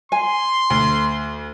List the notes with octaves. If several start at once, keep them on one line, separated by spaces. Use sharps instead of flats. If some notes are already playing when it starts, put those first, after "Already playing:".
G#5 C6
D2